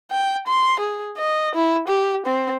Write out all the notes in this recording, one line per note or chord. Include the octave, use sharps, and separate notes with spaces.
G5
C6
G#4
D#5
E4
G4
C4